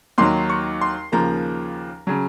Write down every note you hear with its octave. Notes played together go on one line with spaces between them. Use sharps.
D#2 D#3 F#3 C6
C#6
C6
D#2 C#3 F3 A#3 A#5
C#3 F#3